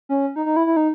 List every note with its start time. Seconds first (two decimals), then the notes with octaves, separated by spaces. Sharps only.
0.09 C#4
0.36 D#4
0.46 D#4
0.56 E4
0.67 E4
0.77 D#4